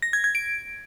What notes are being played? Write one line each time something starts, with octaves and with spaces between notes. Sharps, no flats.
A#6
G#6
G#6
D7